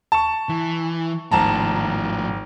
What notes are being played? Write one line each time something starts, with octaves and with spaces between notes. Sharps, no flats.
A5 C#6
E3
G#1 A2 F3 A5 A#5